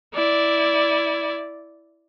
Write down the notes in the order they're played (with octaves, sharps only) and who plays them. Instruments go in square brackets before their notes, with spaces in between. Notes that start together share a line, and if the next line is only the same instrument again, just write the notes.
[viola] E4 D5